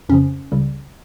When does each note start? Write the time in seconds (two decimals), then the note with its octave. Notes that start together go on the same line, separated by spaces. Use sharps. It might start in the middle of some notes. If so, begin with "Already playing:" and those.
0.09 F2 C#3 F3 C#4
0.52 C#2 C#3 G3